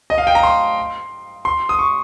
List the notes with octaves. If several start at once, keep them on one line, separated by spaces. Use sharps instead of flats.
D#5
F5
G5
A#5
C6
C6
D#6
C#6